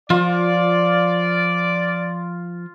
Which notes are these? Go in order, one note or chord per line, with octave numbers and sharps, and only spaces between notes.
F3 F4 D5